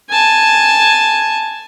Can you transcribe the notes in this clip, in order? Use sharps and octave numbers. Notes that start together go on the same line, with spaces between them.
G#5 A5